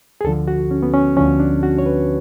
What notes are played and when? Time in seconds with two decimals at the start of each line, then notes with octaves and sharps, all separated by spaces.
0.21 G#4
0.24 D2 D3 F3 A4
0.48 F#4
0.71 C#4
0.83 B3
0.94 C#4
1.17 D2 D3 F3 C#4
1.40 D4
1.63 F#4
1.78 C#5
1.86 B4